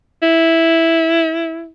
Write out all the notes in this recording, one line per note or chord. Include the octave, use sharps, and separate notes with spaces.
E4